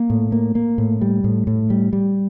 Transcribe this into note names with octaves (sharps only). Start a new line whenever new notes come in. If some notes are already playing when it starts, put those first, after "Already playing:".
Already playing: A#3
A2
A#3
A#3
A2
G3
A2
A2
G3
G3